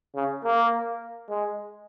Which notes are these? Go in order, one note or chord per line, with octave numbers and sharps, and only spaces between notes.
C#3
A#3
G#3